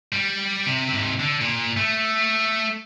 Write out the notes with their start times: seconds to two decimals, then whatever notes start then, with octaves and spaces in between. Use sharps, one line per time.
0.13 G3
0.66 C3
0.89 G#2 C3
1.20 D3
1.41 A#2
1.77 A3